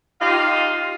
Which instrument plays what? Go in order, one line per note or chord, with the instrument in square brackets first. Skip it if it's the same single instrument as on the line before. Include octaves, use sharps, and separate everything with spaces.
[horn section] D#4 F4 G4 F5